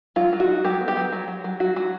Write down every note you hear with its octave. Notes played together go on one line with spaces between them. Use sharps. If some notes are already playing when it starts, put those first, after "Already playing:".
F#3 F4
F#3
F#4
D#4
F#3 G4
B3
G4
F#3
F#3
F#3
F#3
F#3 F#4
F#3 F#4